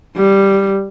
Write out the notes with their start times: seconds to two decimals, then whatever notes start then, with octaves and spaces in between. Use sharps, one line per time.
0.16 G3